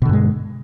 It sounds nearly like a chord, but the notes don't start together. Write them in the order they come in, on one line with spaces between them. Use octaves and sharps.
B2 D3 G2 G#3